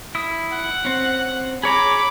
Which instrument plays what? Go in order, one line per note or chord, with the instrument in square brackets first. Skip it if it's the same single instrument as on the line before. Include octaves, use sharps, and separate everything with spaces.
[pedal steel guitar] E4 D#6
[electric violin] F#5
[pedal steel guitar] C4 C#4
[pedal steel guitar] G#4 C#5 A#5 [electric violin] B5 D6